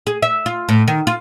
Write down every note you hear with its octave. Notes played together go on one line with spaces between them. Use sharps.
G#4
E5
F4
A2
D#3
F4